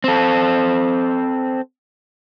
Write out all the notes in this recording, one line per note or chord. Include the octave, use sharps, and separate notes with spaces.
C4 A4